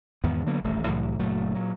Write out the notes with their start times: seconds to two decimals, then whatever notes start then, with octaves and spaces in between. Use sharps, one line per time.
0.24 E2 G#2 D#3 B3
0.46 D3 F#3 A#3 B3
0.64 D#1 A1 G2 A3
0.85 C2 A2 E3 F#3
1.19 F#1 A#2 F#3 A3
1.55 A#2 F#3